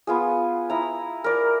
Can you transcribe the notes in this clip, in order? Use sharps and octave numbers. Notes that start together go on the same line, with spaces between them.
B3 F4 G#4
E4 A#5
A#4 D5